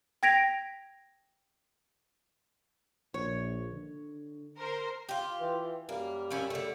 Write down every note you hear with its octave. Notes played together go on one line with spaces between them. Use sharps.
G5 G#6 A#6 B6 D7 F7
A#1 C#5
D3
A#4 C5
F4 G4
E3
F#2 G3 A#3
F3 C#4 E4
D3 A3